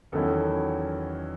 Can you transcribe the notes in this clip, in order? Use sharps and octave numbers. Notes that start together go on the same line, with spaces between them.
E2 D#3 F#3 C#4 E4 A4